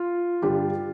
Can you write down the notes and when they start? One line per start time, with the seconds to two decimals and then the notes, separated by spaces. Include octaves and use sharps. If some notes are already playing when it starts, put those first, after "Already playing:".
Already playing: F4
0.42 G2 D3 G3 D4 G4